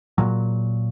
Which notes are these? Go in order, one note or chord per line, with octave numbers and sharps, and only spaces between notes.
A#2 F#3